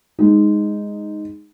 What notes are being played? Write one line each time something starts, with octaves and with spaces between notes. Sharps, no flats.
G#3 D#4